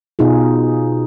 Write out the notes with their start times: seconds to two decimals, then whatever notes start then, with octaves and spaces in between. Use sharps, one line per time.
0.19 B2 D#4 F4 G#4